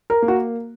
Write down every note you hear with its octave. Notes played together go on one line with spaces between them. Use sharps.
A#4
A#3
F#4